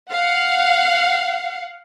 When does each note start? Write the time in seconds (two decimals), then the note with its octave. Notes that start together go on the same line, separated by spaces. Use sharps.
0.10 F5 F#5